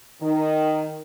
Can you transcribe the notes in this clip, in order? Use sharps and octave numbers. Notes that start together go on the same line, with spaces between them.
D#3